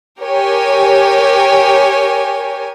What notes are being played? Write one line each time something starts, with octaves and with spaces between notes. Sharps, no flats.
G4 A#4 C#5 G#5